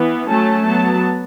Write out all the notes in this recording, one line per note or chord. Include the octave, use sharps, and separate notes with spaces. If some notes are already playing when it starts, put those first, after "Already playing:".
Already playing: E3 B3
F#3 A3 C#4 A5
F#3 B3 A5